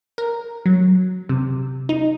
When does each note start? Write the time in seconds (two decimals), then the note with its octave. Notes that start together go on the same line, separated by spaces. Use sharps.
0.18 A#4
0.66 F#3
1.29 C3
1.89 D#4